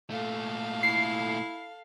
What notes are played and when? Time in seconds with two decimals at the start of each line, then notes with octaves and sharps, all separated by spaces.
0.10 A#2 A3 A4 F5
0.83 E4 C7